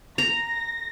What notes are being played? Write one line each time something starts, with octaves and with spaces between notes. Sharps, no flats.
A#5 A#6